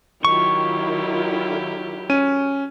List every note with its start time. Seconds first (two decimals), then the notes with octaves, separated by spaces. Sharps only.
0.25 D#3 F#3 E4 F4 G4 C#6
2.10 C#4 D#7